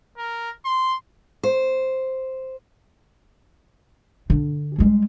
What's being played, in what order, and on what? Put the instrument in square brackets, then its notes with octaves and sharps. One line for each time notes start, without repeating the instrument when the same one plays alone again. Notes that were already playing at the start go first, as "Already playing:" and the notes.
[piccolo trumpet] A#4
C6
[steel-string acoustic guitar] C5
[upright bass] D3
G3 G#3